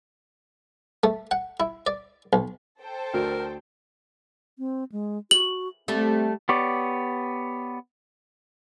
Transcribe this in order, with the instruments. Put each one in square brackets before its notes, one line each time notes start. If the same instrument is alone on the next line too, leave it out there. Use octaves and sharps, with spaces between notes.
[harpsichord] A3
F#5
E4
D5
B1
[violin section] A4 C5 G5
[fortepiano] D2 [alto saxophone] A#4
[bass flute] C4
G#3
[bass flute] F#4 [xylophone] F#7
[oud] G3 A3 [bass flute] C4
[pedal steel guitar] B3 G4 C#5 D5